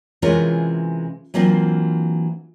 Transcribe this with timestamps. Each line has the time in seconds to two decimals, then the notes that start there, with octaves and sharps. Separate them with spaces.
0.22 C3 E3 G#3 C#4 F4 A#4
1.34 E3 F#3 A#3 C4 D4 F4